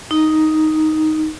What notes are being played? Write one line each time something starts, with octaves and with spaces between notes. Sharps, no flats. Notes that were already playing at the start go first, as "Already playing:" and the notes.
D#4